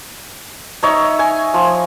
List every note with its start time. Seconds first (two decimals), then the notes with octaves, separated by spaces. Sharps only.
0.83 D#4 C#5 E5
1.19 G#5
1.54 F3